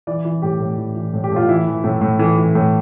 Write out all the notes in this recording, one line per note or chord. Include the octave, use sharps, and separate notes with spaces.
E3 D5
E3
A2 G4
A2
E3
E3
A2
G4
A2 F4
E3 E4
E3
A2 A3
A2
E3 A3
E3
A2